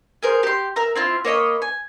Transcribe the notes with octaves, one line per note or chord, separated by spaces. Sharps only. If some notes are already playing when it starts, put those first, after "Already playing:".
G#4 A#4 C5
G4 C6
A#4 E5 A#5
C4 E4 F4
A#3 C#5 D#5 B5
G#5